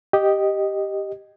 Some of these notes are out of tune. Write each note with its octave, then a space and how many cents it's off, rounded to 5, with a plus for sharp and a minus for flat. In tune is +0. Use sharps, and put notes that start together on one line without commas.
G4 +0 D#5 -5